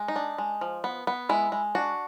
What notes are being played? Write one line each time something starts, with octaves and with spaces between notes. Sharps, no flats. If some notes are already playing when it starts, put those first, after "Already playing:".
Already playing: G#3
D#4
D4
G#3
F3
B3
B3
G#3 E4
G#3
D4 F#4